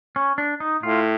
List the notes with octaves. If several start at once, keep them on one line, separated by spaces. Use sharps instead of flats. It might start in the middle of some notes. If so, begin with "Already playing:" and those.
C#4
D4
D#4
A2 F4